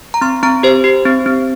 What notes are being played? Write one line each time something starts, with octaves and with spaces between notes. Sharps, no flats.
A#5
C4 C6
C4 A#5
G4 C5
G4
C4
C4